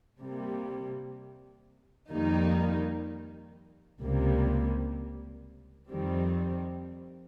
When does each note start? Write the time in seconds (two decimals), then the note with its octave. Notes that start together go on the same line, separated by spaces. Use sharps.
0.21 C3 G3 A#3
2.10 F2 D#3 G3 A#3 D#4
3.99 C#2 C3 G3 A#3
5.89 F2 D#3 G3 C4